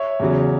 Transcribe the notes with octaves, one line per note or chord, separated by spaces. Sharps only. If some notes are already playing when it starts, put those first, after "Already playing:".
Already playing: C#5 E5
E2 C#3 F#3